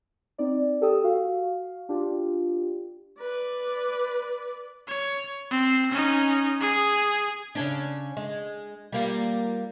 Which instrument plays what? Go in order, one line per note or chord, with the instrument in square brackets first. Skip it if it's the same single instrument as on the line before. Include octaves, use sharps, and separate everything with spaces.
[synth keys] C4 D#4 D5
G4 A4 G5 D#6 E6
F#4 F5
D4 F4 G4
[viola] B4 D5
[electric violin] C#5
C4
C#4 D#4
G#4
[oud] C#3 C#4 D4
G#3
G3 A#3 F4